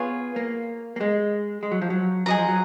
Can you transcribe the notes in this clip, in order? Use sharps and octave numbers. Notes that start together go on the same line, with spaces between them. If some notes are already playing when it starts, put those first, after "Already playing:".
Already playing: B3 F4 G#4 C#5 F5
A#3
A#3
G#3
G#3
F#3
F3
F#3
F#3 G#4 D#5 A#5
F3
F#3